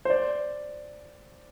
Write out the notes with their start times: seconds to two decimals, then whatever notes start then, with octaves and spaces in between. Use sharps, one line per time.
0.05 C5
0.10 D5